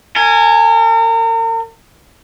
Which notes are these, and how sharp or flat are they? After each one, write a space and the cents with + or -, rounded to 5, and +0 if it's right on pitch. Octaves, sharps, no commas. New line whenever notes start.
A#4 -40 G#5 +0